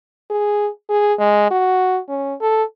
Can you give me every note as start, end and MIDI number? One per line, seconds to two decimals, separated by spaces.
0.30 0.69 68
0.89 1.13 68
1.19 1.50 56
1.51 2.00 66
2.08 2.34 61
2.41 2.63 69